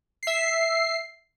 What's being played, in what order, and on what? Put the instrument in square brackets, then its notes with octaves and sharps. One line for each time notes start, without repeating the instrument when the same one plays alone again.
[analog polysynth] E5 C7